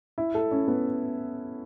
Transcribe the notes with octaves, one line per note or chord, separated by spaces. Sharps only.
E4
A4
C#4
B3